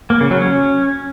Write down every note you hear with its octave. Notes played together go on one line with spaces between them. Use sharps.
A#3
C#3
F#3
C#4